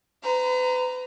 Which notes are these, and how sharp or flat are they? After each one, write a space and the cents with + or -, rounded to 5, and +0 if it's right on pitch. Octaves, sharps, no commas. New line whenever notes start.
B4 +40 A#5 +0